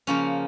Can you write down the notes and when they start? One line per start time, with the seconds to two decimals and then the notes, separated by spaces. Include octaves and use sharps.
0.07 C#3 F3 A#3 C#4